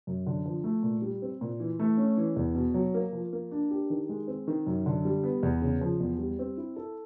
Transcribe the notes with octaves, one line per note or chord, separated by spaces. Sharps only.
F#2
D3
F3
A3
A#2
G3
C4
A#2
E3
A3
C#4
E3
E2
B2
F#3
A#3
F3
A#3
D4
G4
D#3
G#3
C4
D#3
F#2
D3
G3
B3
E2
C#3
F3
E2
G3
C4
E4
A4